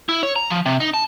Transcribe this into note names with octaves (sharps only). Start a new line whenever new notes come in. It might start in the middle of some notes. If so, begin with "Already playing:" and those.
E4
C#5
A#5
F3
C3
D#4
A5